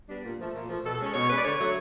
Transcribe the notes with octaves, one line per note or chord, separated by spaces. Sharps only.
G3 B3 D4
A#2
F3 A3
A#2
F3 A3
B2 A4
A4
G#3 C#4 C#5
B2 C#5
G#3 C#4 B4
D5
D3 C#5
F#3 A3